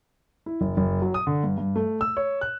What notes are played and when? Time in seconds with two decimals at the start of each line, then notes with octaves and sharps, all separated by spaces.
0.46 E4
0.61 F#1
0.77 F#1
1.02 F#3
1.14 D#6
1.27 D3
1.44 G2
1.58 G2
1.76 A3
2.01 E6
2.17 C#5
2.41 F#6